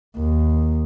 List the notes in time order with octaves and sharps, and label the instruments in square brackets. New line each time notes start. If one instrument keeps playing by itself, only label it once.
[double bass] D#2